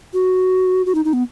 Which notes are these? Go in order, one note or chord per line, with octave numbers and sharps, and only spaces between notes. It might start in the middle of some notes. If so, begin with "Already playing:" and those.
F#4
F#4
D#4
D#4
B3